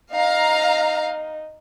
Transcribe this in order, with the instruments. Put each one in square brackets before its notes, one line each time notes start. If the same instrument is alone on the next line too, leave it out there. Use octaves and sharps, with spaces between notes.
[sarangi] D#4 [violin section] F5 A#5